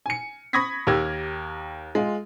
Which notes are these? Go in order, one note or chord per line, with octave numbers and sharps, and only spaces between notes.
G#5 C#7
B5 C#6 D#6 G#6 A#6 B6
D#2 G4 A#4 A#5 E6 G#6
G#3 F4